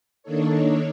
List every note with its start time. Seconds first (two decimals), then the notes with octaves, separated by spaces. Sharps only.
0.23 D#3 A#3 D4 D#4 A4 C#5